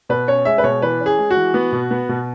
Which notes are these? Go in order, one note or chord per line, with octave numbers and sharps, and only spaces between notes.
B2 B4
C#4 C#5
G#3 E5
B4
B2 C#5
E3 B4
C#4
G#4
G#3
F#4
E3
B3
B2
B3
B2